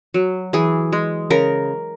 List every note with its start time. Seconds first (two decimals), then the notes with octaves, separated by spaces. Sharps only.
0.14 F#3
0.53 E3 G#4
0.93 G#3
1.30 C#3 A#4